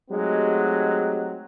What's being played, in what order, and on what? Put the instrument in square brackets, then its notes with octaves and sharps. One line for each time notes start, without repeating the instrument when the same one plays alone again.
[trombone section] F#3 G#3 A3 C4 D#4 G4